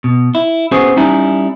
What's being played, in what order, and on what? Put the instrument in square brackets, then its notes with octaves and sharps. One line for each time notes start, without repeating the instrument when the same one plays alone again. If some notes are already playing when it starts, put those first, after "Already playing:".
[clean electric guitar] B2
E4
B3 C#4 F#4 G#4 C5
G3 C#4 D#4 E4